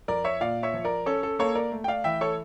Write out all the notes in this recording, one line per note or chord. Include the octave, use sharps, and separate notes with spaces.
F2 A#4 D5
C#5 E5
A#2 D5 F5
C#5 E5
F3
A#4 D5
C#4 A4 C#5
A4
A#3 A4 C#5
A#4 D5
A3
G5
D5 F5
E3 E5 G5
A4 C#5